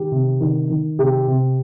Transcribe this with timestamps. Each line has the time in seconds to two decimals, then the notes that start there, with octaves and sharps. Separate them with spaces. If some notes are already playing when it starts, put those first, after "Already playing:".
Already playing: D#3 G4
0.11 C3
0.40 D#3
0.70 D#3
0.98 C3 G4
1.27 C3